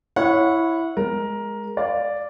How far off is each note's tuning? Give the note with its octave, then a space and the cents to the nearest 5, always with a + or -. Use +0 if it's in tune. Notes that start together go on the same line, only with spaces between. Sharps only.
E4 +0 C#5 +0 F#5 -25
G#3 +0 A#4 +10
D5 +0 F5 +0